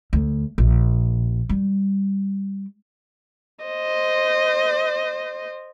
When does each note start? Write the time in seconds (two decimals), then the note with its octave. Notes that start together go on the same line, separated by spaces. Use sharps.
0.13 D2
0.58 A#1
1.49 G3
3.64 C5 D#5